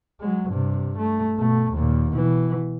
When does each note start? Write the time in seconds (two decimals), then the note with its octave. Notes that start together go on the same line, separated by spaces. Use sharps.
0.21 F#3 G#3
0.50 G2 C3
0.98 A3
1.37 B2 A3
1.73 D#2 A#2
2.10 B2 E3